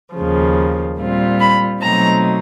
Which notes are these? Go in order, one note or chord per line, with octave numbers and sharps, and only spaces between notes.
D#2 C#3 F3
A#2 G3 C4 F4
B5
B2 F#3 A3 C4 D#4 A#5